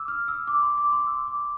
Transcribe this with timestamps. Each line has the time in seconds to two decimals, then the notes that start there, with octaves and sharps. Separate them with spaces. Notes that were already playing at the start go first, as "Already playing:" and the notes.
Already playing: D6 E6
0.08 F6
0.28 E6
0.47 D6
0.63 C6
0.78 D6
0.93 C6
1.07 E6
1.28 D6